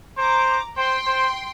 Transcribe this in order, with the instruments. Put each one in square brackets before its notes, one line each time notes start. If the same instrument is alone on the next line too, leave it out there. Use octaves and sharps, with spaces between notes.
[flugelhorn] C5 [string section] A#5 D6
[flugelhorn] C5 [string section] G5 C6
[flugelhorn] C5